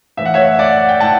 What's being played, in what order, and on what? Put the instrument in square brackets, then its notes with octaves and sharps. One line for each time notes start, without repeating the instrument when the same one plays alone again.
[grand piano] A2 E3 E5
F#5
C#5 E5
D5 F#5
G5
A2 F#5 A5